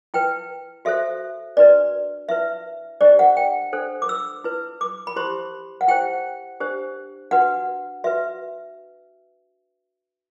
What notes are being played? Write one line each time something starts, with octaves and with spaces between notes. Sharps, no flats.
E4 B4 G5
F#4 A4 C5 E5
D4 F#4 B4 D5
E4 B4 E5
D4 G4 C5 D5
F#5
G5
D4 A4 C5
D6
E6
E4 B4
D6
B5
E4 G4 C5 C6
F#5
E4 G4 C5 G5
D4 G4 C5
D4 F#4 B4 F#5
F#4 B4 E5